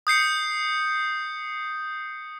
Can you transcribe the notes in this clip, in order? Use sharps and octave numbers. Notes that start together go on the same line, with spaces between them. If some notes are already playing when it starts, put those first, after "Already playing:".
D#6 G6 C7 C#7